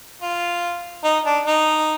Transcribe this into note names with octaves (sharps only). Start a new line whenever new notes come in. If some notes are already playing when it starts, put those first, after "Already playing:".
F4
D#4
D4
D#4